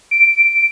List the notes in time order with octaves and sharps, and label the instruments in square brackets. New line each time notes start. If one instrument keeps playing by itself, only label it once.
[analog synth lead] D7